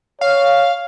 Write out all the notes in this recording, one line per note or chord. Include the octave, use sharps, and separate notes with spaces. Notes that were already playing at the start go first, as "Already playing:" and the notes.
C#5 F5